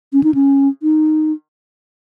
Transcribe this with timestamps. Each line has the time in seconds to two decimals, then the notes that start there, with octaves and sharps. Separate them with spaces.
0.13 C#4
0.23 D#4
0.34 C#4
0.83 D#4